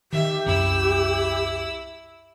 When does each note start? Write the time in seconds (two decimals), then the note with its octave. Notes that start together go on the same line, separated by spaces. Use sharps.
0.13 D#3 G4 E5
0.46 C2 F#2 E4 E6